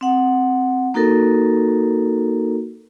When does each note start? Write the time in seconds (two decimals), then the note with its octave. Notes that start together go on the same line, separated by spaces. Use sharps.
0.01 C4 F#5
0.94 A#3 D#4 F#4 A4 A#4